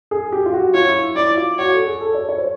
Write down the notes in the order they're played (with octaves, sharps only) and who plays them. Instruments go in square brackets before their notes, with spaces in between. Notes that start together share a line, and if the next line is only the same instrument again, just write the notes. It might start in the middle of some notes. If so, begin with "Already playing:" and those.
[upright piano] G#4
G4
F4
F#4
[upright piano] F4 [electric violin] C#5
[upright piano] E4
[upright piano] E4 [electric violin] D5
[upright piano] F4
[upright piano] F#4 [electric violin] C#5
[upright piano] A4
G#4
A4
C#5
C#5
C5